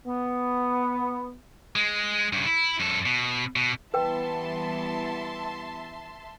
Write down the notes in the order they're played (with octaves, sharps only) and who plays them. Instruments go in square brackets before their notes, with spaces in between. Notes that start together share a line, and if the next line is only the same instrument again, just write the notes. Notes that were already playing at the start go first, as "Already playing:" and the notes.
[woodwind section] B3
[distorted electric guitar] G#3
G2 C#3
E4
F#2 A4
B2
B2
[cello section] E3 G3 B3 [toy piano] B4 G5 [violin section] E5 A5 C6